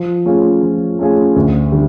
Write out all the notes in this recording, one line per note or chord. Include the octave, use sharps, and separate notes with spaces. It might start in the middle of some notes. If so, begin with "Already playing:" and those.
Already playing: F3
A3 C#4 F4 G#4
F3
A3 C#4 F4 G#4
D2
D3 G3